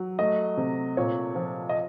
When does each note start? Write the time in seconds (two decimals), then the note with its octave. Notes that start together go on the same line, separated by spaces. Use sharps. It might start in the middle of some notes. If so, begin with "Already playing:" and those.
Already playing: F#3
0.19 A3 D#5
0.57 C3
0.97 A#2 C#5
1.35 F3
1.69 D#5